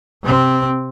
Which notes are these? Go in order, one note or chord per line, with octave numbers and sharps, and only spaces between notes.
C3 C4